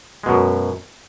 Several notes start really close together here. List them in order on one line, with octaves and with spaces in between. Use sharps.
G#3 B2 F#2